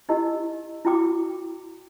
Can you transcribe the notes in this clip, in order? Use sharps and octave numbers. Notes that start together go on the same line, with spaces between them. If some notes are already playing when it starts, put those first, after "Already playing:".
D#4 E4 G4 A#4 D#5
E4 F#4 G5 D6